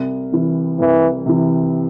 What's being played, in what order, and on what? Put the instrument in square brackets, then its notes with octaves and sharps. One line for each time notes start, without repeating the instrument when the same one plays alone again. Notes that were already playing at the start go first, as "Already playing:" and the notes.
Already playing: [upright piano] C2
C3 E3
[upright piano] C2 [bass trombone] E3
[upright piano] C3 E3